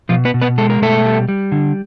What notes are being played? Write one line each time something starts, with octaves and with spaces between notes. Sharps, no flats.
B2 F3 F4
B3 B4
B2
B3 B4
G#3 A4
A#4
B2 A3 A4
G3
G3
D3